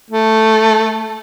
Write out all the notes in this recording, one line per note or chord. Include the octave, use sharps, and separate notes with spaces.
A3